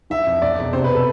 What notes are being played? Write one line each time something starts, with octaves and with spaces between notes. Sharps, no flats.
E3 E5
F2
E2 D5
E1
C3 C5
B4
A4